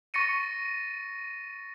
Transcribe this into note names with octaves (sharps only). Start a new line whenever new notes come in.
C#6 A6 A#6 C#7 D#7